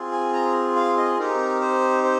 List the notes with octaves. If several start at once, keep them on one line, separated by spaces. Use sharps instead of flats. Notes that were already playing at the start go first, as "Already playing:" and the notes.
Already playing: C4 F4 G#4
G#5
A#5
F5
D#5
C4 D#4 G4 A#4
C5
C5